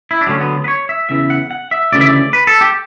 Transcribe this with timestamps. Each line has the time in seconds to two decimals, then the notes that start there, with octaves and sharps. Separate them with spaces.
0.11 E4
0.21 D4
0.27 D2 D3 F#3 C#4
0.41 B3
0.64 B4
0.68 C#5
0.89 E5
1.09 E2 C#3 E3 E5
1.30 F#5
1.51 F#5
1.71 E5
1.92 D2 C#3 E3 D5
2.01 E5
2.09 D5
2.33 B4
2.47 A4
2.61 G4